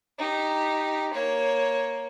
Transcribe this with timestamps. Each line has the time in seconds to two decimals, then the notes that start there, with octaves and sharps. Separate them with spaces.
0.18 D#4 G4
1.13 A#3 C#5